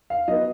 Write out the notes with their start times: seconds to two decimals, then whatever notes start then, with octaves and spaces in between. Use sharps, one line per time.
0.10 F5
0.28 F#3 B3 D#5